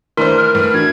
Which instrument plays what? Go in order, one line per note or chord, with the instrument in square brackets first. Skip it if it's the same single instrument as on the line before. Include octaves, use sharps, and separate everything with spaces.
[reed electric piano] D#3 A3 C6 [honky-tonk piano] E3 D4 C5 [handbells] A#4
[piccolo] F6
[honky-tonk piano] A2 [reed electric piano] B4
[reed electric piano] E3 D4 F#4 [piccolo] G#6